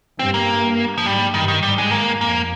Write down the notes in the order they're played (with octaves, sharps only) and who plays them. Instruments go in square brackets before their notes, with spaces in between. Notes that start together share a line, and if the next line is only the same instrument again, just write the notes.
[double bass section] G2 [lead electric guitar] C4
[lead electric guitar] A#3
F3
[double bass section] G#2 [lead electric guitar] G3
[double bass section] G2 [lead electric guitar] D#3
[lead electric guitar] D#3
[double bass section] G#2 [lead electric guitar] G3
[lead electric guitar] G#3
A#3
[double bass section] F2 [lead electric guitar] A#3